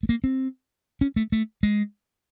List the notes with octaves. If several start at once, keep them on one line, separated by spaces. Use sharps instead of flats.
A3
A#3
C4
C#4
A3
A3
G#3